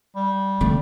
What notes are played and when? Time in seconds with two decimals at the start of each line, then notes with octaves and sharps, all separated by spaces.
0.16 G3
0.61 D3 A3